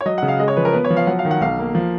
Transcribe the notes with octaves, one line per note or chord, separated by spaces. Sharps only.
C#5
F#3 D#5
C#3 F#5
F5
G#3 D#5
C#5
F3 B4
A#4
B3 B4
C#5
F3
F5
F#3 F#5
F5
D#3
F#5
B1 F5
A#3
F3